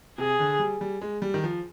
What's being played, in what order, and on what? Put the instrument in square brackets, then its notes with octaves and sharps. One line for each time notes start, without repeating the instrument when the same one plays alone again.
[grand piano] C3 [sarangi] G#4
[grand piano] D3
G3
G3
G#3
G3
D#3
F3